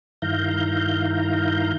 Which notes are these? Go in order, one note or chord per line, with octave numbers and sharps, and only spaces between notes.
G2 D#3 E4 F5 A#5 G6